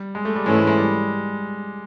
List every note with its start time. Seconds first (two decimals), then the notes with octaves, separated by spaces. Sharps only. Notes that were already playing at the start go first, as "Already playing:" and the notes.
Already playing: G3
0.15 G#3
0.25 A3
0.36 G3
0.46 G#2 E3 G#3 A3 C#4 E4
0.56 G#3
0.67 G#3
0.77 G3